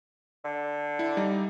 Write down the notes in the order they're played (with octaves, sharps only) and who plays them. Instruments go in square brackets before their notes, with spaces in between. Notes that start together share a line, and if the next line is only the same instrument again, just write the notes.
[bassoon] D3
[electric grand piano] E4
G3 D#4